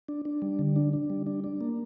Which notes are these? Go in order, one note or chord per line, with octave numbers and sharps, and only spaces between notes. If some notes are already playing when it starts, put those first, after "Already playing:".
D4
D4
G3
D3
D4
D4
G3
D4
D4
A#3